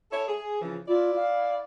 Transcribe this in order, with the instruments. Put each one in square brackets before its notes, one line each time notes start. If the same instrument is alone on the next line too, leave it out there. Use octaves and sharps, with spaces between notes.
[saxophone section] E4 A4 C#5
G#4
C#3 E3 F3
[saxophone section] E4 D5 [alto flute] F4
[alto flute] F5